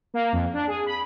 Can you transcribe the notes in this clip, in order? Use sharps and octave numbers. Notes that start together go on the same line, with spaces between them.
A#3
F2
D4
G#4
B5